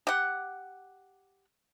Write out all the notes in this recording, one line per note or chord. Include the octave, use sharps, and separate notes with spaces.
G4 F#5